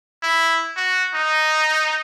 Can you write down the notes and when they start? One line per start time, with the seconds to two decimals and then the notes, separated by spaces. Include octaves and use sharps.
0.23 E4
0.76 F#4
1.15 D#4